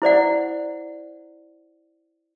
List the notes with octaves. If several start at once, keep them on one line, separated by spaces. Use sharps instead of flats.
E4 C5 D5 F#5